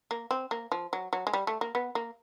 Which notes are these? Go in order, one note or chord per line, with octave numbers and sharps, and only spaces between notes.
A#3
C4
A#3
F3
F#3
F#3
G#3
G3
A3
A#3
B3
A#3